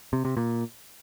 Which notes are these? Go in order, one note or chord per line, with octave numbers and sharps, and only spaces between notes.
C3
C3
A#2